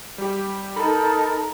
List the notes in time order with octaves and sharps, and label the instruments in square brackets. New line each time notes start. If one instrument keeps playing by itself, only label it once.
[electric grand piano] G3 G4
[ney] D#4 [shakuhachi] A4 [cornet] A#4 [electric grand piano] B5